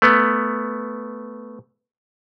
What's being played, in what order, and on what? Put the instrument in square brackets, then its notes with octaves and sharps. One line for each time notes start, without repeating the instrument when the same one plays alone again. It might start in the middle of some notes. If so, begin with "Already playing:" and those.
[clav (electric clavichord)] A3 B3